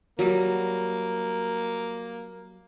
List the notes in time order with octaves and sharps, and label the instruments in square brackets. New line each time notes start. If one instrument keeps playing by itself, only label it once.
[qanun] F#3 G3 [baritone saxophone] A#3